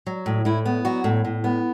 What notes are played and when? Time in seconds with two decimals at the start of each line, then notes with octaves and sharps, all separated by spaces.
0.06 F#3
0.26 A2
0.45 A2 E4
0.66 B3
0.85 F#3 F#4
1.04 A2
1.25 A2
1.44 B3